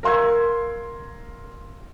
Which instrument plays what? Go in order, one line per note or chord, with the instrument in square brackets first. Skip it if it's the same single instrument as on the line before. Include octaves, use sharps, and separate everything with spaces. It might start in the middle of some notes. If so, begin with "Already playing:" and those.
[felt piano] A#4 F5 C6 E6 G#6